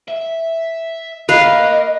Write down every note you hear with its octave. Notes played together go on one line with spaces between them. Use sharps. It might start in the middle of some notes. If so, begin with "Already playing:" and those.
E5
A#3 A#4 B4 D#5 F5